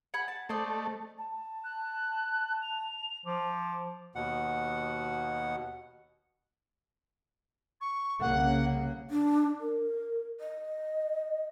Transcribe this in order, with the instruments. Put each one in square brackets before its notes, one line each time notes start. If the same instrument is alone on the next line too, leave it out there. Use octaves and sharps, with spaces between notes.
[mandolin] F#5 G#5 B5
A5
[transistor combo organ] A3 [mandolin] C5 D5 D#5
[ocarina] A5
[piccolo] F#6
F7
[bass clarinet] F3 [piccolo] D6
[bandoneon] D#2 B2 F#5
[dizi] C#6
[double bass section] C2 C#3 A#3 [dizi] F#5
[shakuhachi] D4
A#4
D#5